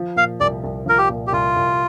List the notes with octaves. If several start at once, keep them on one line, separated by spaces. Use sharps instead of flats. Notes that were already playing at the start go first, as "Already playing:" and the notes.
Already playing: F3
A#2 F5
C2 D5
C2
F3 A#4
G4
A#2
G4
C2 F4
C2